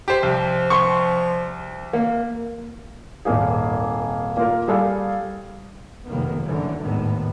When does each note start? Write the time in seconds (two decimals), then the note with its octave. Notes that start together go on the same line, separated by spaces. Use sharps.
0.08 G4 C5
0.23 C2 F3
0.70 C6 C#6
1.93 A#3
3.25 D#1 G#1 A#3 G#4
4.37 A#3 F4 A#4
4.67 G3 G#4 A4 F5
6.07 F1 F#2 B2 D#3 A#3 B3
6.44 F#1 D3 E3
6.82 G#1 D#2 A2 D#3 B3